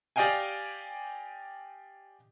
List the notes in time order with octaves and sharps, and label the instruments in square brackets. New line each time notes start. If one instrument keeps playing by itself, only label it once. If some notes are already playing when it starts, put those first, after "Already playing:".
[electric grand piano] G4 D5 D#5 F5 G5 G#5